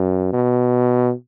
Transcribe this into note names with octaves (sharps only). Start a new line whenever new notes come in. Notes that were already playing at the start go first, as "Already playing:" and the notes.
Already playing: F#2
B2